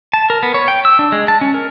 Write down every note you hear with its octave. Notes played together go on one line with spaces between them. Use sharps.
A5
A#4
B3
C#5
G5
E6
D4
G#3
A5
C#4
A#4